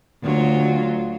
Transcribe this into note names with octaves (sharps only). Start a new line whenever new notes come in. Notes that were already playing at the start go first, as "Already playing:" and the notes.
D2 F#3 F4